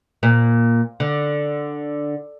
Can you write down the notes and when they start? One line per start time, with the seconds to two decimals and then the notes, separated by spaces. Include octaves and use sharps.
0.23 A#2
1.00 D3